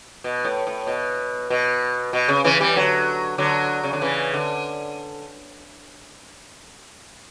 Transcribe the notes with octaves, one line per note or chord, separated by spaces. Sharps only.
B2
A2
A2
B2
B2
B2
C#3
C#3 E3
E3 G3
D3 F#3
D3 F#3
C#3
D3
C#3 E3
D3